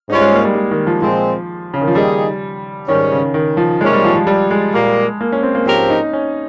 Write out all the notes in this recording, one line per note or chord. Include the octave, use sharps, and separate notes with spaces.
G#2 G3 C#4 D#4 F4
G#3
A#3
G3
G3
D#3
F3
A#2 F3 G#3 C4
C#3
D#3
F3
D#3 G3 A#3 D#4 G#4
G#2 D#3 G3 C#4
C#3
D#3
F3
C3 D#3 G#3 A#3 C#4
G3
F3
F3
G3
G#3
A#2 G3 A#3
A#3
C#4
C4
A#3
G#2 F3 C4 C#4 G4 A#4
D#4
C#4